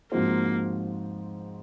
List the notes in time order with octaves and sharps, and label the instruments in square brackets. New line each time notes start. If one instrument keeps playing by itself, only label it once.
[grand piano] G#2 F3 C4 F#4 C5 [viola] A#3